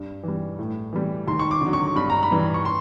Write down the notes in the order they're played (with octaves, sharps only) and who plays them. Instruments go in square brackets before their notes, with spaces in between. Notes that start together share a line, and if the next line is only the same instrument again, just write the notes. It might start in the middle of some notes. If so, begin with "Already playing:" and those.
Already playing: [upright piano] G2
E3 G3
A2
E3 G3
D#2 C6
C#6
D6
D3 F#3
C#6
G2 B5
A#5
B5
E3 G3
C#6
C6